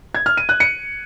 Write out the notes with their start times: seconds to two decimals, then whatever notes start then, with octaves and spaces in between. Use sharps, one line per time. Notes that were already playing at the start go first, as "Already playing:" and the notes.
0.15 G#6
0.26 F6
0.37 D#7
0.49 F#6
0.60 C#7